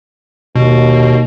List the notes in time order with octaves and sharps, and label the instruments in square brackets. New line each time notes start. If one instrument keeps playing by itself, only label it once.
[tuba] D#2 [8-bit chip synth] B2